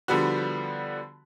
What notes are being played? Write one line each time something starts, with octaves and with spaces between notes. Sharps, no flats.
D3 F3 G3 B3 F#4